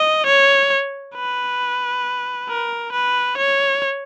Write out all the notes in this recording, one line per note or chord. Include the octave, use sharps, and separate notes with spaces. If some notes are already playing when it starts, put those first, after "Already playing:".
Already playing: D#5
C#5
B4
A#4
B4
C#5